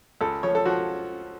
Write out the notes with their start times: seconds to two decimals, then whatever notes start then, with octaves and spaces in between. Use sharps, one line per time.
0.21 C#2 A4
0.43 F3 C#5
0.55 A4
0.65 F3 F#4